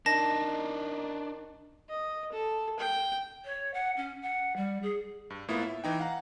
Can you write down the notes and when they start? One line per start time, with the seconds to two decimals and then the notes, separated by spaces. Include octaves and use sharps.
0.06 D#3 D4 D#4 A5 A#6
1.89 D#5
2.32 A4
2.79 G5
3.44 C#5
3.74 F#5
3.97 C#4
4.22 F#5
4.56 G3
4.82 G#4
5.30 G2
5.48 A2 A#3 B3 E4 F4
5.62 E5
5.84 E3 D#4 G5
6.00 F5 F#5 A#5